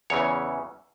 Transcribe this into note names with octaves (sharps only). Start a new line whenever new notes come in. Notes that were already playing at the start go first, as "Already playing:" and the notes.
E2 C#3 E3 C#5